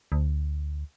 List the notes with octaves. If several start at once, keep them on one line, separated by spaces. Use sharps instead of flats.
D2